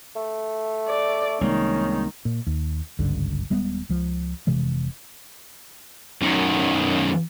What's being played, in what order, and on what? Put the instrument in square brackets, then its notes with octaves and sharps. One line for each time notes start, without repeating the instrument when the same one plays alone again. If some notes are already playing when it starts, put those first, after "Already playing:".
[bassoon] A3
[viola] D5
[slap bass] C2 G#3 A#3 [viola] D#3 [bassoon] C#4
[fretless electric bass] A#2
D#2
G#1 C#2 G2 D3
D#1 G3 G#3 B3
C#2 F3
F1 C3 E3 G#3
[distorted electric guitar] F#2 D#3